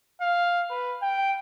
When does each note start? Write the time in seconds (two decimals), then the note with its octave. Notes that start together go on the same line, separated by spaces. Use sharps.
0.21 F5
0.71 B4
1.02 G5